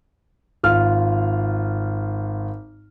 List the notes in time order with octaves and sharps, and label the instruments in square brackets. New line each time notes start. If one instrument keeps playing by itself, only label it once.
[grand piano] G#1 F4 F6